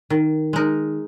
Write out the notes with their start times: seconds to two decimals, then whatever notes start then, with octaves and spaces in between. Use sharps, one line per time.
0.10 D#3
0.53 G#3 D#4 A#4